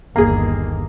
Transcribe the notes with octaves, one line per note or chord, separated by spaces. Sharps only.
G1 D#2 A#3 G#4